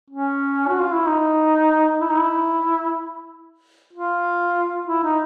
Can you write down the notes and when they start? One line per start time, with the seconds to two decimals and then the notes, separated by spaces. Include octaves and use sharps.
0.10 C#4
0.68 F#4
0.80 F4
0.93 E4
1.07 D#4
2.01 E4
2.10 D#4
2.18 E4
3.93 F4
4.87 E4
5.04 D#4